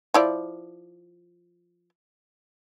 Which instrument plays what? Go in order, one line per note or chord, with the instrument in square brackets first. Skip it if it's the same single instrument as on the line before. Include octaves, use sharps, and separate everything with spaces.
[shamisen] F3 E4 D5